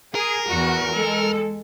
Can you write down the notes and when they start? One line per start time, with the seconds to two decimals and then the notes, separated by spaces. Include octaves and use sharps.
0.15 G#4 A#4
0.48 E2 F#4
0.93 G#3 A4